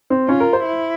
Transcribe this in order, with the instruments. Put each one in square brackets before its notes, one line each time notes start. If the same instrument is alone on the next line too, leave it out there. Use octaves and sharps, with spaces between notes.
[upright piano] C4
[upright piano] C#4 [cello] F4
[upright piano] A#4
C5
[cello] E4